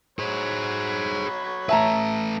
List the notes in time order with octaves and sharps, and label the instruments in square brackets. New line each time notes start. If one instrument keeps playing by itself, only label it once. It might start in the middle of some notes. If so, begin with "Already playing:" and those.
[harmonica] F#3 C#5 B5 [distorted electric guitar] G#4 C5
[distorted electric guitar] A3 B4 [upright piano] E5 A5 A#5